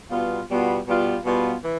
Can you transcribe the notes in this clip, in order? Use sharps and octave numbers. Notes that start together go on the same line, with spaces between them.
B2 G3 B3 F4
B2 G3 B3 F4
B2 G3 B3 F4
B2 G3 B3 F4
E3